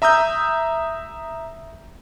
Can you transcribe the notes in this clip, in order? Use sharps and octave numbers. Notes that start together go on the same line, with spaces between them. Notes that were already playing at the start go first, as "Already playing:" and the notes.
E5 A#5 D#6 E6 G6